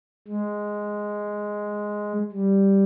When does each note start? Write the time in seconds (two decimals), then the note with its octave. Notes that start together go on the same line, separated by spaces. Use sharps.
0.28 G#3
2.32 G3